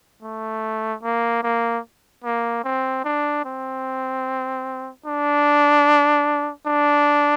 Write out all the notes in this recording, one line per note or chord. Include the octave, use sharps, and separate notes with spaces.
A3
A#3
A#3
A#3
C4
D4
C4
D4
D4